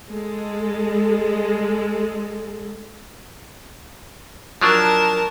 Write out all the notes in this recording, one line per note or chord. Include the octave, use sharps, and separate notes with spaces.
G#3 A4
F3 F#3 D4 A#4 A5